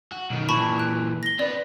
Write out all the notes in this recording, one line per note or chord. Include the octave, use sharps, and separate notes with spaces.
F#4
B1 D#3
A#2 E3 A5 B5 C#6
F#6 D7
A#6 G7
C4 B4 D5